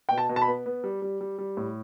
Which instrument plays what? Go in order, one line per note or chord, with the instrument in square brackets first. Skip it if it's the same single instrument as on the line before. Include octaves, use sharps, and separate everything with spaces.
[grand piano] B2 G5
A5
B2
A5
B5
B3
B3
G3
G3
G3
G3
A2